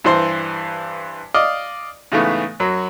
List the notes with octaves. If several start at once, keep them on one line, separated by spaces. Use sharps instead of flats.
G2 E3 C5 C6
D5 D#5 F5
G#2 C#3 E3 A3 B3
F#2 F#3